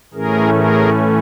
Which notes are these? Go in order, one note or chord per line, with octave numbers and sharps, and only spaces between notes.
A2 E3 A3 C#4 G#4 A#4
G#4 A#4